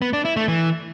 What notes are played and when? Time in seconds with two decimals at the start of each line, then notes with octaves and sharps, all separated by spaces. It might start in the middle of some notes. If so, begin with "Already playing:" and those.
0.02 B3
0.13 D4
0.25 E4
0.36 A3
0.48 E3